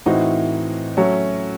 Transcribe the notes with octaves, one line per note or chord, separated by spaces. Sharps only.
A2 E3 C4 D#4 F#4
F#3 A3 C#4